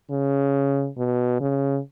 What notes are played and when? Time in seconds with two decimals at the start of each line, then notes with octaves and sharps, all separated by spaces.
0.11 C#3
0.98 B2
1.41 C#3